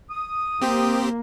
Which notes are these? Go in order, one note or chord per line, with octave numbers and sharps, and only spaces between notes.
D#6
A#3 C4 G4 C5